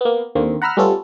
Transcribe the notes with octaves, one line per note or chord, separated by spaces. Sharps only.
A#3 B3
D#2 D3 A#3 C4
F#5 A#5 B5 E6 F6
G3 A3 B3 C#4 F4 A4